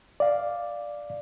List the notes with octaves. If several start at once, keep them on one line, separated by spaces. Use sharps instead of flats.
D5 F5